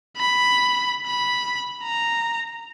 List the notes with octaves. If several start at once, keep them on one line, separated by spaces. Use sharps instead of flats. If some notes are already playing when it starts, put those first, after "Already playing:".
B5
B5
A#5